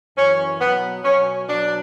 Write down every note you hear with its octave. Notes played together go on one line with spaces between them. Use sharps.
F#2 E3 C#4
B2 F#3 B3
B2 F#3 C#4
B2 F#3 D4